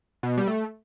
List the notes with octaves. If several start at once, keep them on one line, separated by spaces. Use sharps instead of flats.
B2
G3
A3